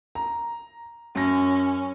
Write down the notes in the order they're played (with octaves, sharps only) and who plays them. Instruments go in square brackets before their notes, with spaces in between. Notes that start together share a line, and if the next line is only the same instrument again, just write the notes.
[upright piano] A#5
[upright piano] F#2 A#6 [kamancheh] C#4